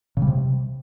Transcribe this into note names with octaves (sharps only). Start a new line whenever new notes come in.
C#3
G3
C3